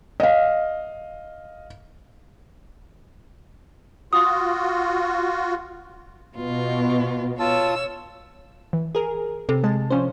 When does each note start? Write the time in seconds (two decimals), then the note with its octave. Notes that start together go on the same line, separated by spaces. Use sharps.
0.20 D#5 F5
4.13 F4 F#4 D#6
6.36 B2 F4
7.39 F4 C#5 A5 E6
8.73 E3
8.95 G#4 A#4
9.49 C3 A4
9.64 G#3 A5
9.90 F3 C#4 D4 C5